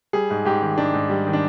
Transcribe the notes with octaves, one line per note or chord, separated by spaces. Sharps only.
G3 G#4
G#2
G#2 G4
D#3
G#2 D4
G#2
G3
D#3
D4